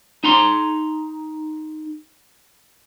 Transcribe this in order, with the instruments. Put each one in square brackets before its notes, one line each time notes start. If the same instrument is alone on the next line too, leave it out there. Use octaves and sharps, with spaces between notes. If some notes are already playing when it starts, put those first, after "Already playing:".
[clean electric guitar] D#4 A#5 C6